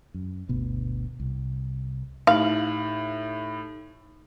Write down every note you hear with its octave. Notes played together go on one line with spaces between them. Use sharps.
F#2
G1 D2 B2 B3
C2
A2 D#4 G4 F5 F#7